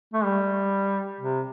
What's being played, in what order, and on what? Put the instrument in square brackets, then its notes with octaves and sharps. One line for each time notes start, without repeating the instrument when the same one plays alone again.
[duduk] A3
G3
C3